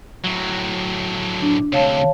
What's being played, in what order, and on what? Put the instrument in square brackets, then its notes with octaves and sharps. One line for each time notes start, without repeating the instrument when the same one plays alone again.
[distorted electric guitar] A2 F#3
[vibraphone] D4
[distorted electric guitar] D2 C3 [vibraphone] C#5 F5 A5